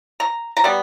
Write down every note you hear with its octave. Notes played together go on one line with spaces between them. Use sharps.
A#5
A#5
G3 B3